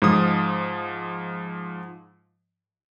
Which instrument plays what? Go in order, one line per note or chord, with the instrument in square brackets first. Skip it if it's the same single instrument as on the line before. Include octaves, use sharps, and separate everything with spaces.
[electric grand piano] G#2 F3 D#6